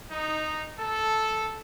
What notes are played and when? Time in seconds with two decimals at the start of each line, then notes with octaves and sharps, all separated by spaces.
0.11 D#4
0.78 A4